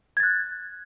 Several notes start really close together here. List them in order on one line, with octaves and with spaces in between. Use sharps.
G#6 A6 F#6